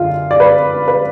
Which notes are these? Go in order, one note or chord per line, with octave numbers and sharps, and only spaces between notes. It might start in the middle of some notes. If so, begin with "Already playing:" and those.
Already playing: F#2 D3 G#3 F4
D5
B4
B4